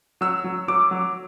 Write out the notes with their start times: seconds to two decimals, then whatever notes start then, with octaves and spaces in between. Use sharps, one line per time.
0.21 F#3 E6
0.44 F#3
0.68 F#3 D6
0.91 F#3